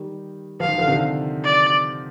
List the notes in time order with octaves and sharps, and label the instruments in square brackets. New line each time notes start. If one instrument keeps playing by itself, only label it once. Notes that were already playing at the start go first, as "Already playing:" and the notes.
Already playing: [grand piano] D#3 G3
[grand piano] F3 [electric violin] F5
[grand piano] D#3
D3 F3
C3 D#3
[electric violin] D5